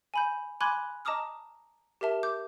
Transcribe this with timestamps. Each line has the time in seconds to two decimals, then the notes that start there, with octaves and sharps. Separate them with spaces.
0.14 G#5 B5 G6
0.61 G#5 B5 C6 D6 F#6 G#6
1.05 D#5 A5 A#5 D6 D#6 F6
2.01 G4 A#4 E5 A5
2.23 D6 G6